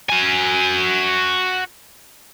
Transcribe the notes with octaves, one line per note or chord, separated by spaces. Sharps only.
F#4 G#5